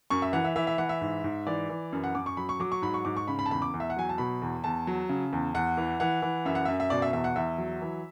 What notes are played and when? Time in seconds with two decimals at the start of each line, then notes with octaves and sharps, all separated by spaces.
0.10 F#2 C#6
0.22 E5
0.33 E3 F#5
0.44 E5
0.56 E3 E5
0.67 E5
0.78 E3 F#5
0.89 E5
1.01 G#2
1.24 G#2
1.47 E3 D5
1.69 E3
1.93 F#2
2.04 F#5
2.15 F#2 D6
2.26 C#6
2.37 F#3 B5
2.49 C#6
2.60 F#3 D6
2.72 C#6
2.82 G#2 B5
2.94 C#6
3.05 G#2 D6
3.17 C#6
3.28 C#3 B5
3.39 B5
3.46 A5
3.51 E2 B5
3.62 D6
3.74 E2
3.80 E5
3.90 F#5
3.97 F#3 G#5
4.09 A5
4.18 B2 B5
4.42 E2
4.64 E2 A5
4.87 F#3
5.09 C#3
5.33 E2
5.54 E2 F#5
5.77 E3
6.00 E3 F#5
6.22 E3
6.45 F#2 E5
6.55 F#5
6.65 F#2 E5
6.80 E5
6.90 B2 D5
7.02 E5
7.13 E2 E5
7.24 F#5
7.36 E2 E5
7.58 F#3
7.81 E3